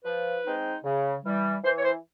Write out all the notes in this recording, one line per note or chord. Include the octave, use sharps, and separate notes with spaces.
F3 B4
G#3 C4 D#4
C#3
E3 G3
E3 C5
C#5
C5